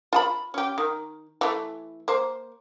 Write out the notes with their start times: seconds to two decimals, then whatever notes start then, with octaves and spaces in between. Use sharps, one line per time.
0.13 F4 A5 B5
0.54 C#4 G4
0.78 D#3
1.41 E3 A3
2.08 A#3 C5